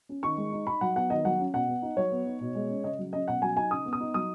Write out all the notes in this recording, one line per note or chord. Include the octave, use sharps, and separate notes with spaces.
C#4
D#3 C#6
G#3
D#4
D#4 B5
F#3 F#5
B3 F#5
D#3 D#5
F#3 F#5
C#4
B2 F#5
B3
D#4
F#3 C#5
B3
D#4
B2
G#3
C#4
C#3 D#5
F#3
C#4 D#5
B2 F#5
F#3 G#5
D#4 G#5
C#3 D#6
B3
D#6
D#4
F#3 D#6